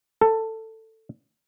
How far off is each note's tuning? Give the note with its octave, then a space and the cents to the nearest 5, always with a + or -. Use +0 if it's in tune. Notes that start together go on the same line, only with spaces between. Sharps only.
A4 +15